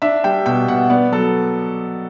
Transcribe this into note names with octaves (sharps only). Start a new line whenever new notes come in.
D4 E5
G3 G5
B2 G5
B2 F#5
B3 D5
F#3 A4